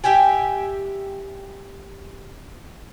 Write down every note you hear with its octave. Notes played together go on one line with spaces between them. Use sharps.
G4 E5 G5 G#5